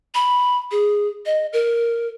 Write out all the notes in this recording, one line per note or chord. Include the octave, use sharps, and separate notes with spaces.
B5
G#4
D#5
A#4